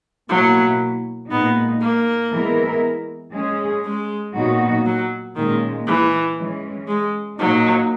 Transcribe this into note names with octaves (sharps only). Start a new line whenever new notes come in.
B2 F#3 A#3 E4
A#2 G#3 B3 D#4
A#3
E3 G#3 B3 E4 A#4
G#3 C#4 G#4
G#3
A#2 F#3 B3 D#4 F#4
F#3
A#2 D#3 G#3 C#4
E3
E3 G#3 C#4
G#3
A#2 F#3 A#3 D#4